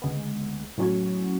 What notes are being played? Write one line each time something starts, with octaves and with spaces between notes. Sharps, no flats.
D2 C#3 G#3 B3
A2 F#3 C#4 F#4 C#5